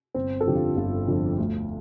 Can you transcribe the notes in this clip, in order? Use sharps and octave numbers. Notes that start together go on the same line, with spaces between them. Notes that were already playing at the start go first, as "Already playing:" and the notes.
G1 C4
A4
F2 D3 F3 G4
F4
G1 F4
F2 D3 F3
D2